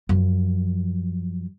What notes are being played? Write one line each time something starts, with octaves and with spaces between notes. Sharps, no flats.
F#2 F3